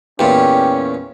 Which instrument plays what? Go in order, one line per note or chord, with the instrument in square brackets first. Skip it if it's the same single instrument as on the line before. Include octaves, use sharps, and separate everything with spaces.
[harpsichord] E2 A#2 [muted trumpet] C#4 [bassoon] G4